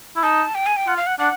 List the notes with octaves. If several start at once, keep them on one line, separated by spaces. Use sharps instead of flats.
E4
D#4 A5
G5
G#5
G5
F4 F#5
F5
F#5
D4 F#5